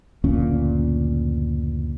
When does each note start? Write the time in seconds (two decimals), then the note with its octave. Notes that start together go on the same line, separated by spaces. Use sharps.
0.24 F#1 D2 A#2 C#4